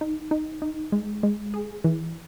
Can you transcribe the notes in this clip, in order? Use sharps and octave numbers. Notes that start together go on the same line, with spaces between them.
D#4
D#4
D#4
G#3
G#3
G#4
E3